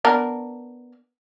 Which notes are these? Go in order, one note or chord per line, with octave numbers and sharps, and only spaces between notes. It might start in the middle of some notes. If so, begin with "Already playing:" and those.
B3 D4 A#4